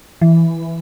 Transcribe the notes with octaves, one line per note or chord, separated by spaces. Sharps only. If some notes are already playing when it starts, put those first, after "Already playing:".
E3